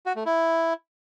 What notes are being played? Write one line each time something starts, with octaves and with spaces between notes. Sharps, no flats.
F#4
A3
E4